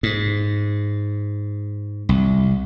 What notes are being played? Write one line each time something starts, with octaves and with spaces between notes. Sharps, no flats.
G#2
C2